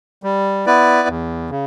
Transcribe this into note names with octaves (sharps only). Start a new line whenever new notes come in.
G3
B3 E4 B4 D5
E2
C#3